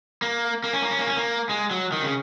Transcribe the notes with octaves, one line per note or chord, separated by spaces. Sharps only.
A#3
A#3
C#4
A#3
C#4
A#3
C#4
A#3
G#3
F#3
D#3
C#3